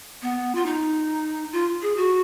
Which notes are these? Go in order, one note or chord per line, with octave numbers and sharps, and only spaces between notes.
B3
F4
D#4
F4
G#4
F#4